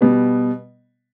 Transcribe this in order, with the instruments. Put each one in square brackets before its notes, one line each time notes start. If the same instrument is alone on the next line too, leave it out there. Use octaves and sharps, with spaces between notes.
[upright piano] B2 G3 B3